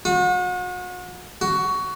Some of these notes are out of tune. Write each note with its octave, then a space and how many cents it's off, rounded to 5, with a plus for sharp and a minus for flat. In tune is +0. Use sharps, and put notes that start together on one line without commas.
F#4 -40
F#4 +15